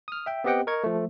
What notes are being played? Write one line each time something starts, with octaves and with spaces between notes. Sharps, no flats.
D#6 F6
E5 G5
B3 C4 G4 D#5 F#5 G5
A#4 D#5 C#6 G#6
F3 A3